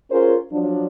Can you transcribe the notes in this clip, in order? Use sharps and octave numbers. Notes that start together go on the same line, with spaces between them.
C#4 F4 G#4 A#4 C5
F3 F#3 D4